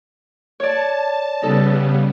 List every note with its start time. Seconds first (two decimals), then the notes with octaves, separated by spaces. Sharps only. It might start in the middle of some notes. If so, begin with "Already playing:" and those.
0.60 C#5 D5 A5
1.42 C#3 G3 B3 D#4 A4